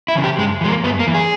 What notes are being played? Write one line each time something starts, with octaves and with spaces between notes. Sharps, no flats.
E4
C#3 E3
G4
G2 G#3
E3 G#3
A#3
G2 B3
A#3
E3
G#4